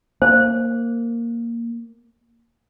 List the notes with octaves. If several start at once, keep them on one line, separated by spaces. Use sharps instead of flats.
A#3 C5